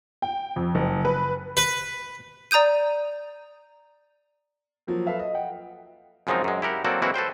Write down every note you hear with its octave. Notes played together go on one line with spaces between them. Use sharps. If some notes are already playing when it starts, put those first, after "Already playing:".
G5
F2
F#1
B4
B4
D5 A#5 D#6 G6 D#7
F3 F#3 A#3
A4 B4 E5 F5
D#5
F#5 G5
F#2 C#3 F3 G#3 C4 D#4
F#2 G#3
E4 G4 A#4 F#5
F#3 A#3 C4 F#4 A4 D5
E3 G#3 A#3 C4 E4 F#4
A4 B4 C5 G5